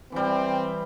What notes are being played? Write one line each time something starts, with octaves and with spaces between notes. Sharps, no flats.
E3 G3 C4